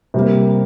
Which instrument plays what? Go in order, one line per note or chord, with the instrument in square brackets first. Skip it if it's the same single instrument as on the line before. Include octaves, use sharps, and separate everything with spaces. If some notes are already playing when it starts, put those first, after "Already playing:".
[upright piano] C3 G3 A#3